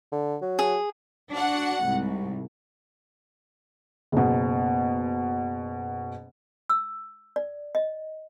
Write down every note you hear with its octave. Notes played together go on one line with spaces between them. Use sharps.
D3
F#3
G#4
D4 F#4 F#5
C2 G#2
F#1 B2
E6
D5
D#5